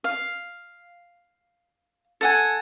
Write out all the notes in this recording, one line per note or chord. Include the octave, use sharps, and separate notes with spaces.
F5
A4 F#5 G#5